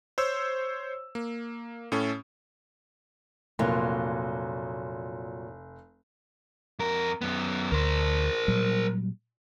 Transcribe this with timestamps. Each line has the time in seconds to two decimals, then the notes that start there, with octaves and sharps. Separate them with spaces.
0.18 C5 C#5 E6
1.15 A#3
1.92 A2 C#4 A4
3.59 F1 A#2 F#3 F4
6.79 F2 A#4
7.21 F#2 B3
7.72 D2 A#4 C5
8.48 A#2 F#3 G3